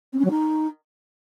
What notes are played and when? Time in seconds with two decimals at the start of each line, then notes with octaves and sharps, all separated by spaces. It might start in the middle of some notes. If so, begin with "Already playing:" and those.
0.13 C4
0.18 C#4
0.24 F#3
0.30 D#4